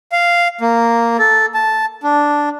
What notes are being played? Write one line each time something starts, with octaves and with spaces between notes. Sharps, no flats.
F5
A#3
A4
A5
D4